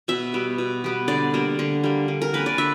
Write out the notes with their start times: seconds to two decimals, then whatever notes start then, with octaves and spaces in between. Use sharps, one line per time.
0.08 B2 E5
0.34 G3 B3
0.58 B2
0.84 G3 B3
1.08 D3 D5
1.34 G3 A#3
1.59 D3
1.84 G3 A#3
2.08 D3
2.22 A#4
2.33 A#3 C#4 B4
2.46 D5
2.58 D3 E5